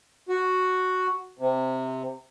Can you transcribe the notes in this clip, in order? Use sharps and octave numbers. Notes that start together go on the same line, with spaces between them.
F#4
C3